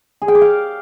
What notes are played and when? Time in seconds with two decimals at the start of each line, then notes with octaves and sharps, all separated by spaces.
0.22 G#4
0.28 G5
0.35 D6
0.42 F5